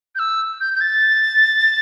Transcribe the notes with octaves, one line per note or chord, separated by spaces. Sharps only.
G6
E6
G6
G6
A6